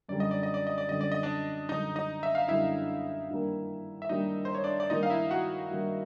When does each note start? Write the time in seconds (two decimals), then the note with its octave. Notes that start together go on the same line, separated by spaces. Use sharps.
0.09 F#2 D3 G3 D5
0.20 D#5
0.31 D5
0.43 D#5
0.54 D5
0.67 D#5
0.78 D5
0.89 F#2 D3 G3 D#5
1.01 D5
1.12 D#5
1.23 D4 D5
1.69 F#2 D3 G3 D#4 D#5
1.96 D#4 D#5
2.23 E5
2.35 F5
2.48 F#2 D3 G3 E4 E5
3.29 G2 D#3 G3 A#3
4.02 E5
4.09 G2 D#3 G3 A#3 D#4 D#5
4.45 C5
4.55 C#5
4.64 D4 D5
4.80 D5
4.90 G2 D#3 G3 A#3 D#4 D#5
5.03 F5
5.10 E4 E5
5.31 F#4 F#5
5.71 G2 D#3 G3 A#3